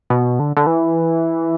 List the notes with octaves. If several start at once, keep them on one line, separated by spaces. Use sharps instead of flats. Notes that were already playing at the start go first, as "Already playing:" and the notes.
B2
D3
D3
E3